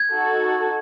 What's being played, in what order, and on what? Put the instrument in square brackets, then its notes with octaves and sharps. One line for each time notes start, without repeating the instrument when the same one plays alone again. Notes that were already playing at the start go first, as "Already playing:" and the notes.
Already playing: [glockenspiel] G#6
[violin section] D#4 F#4 A4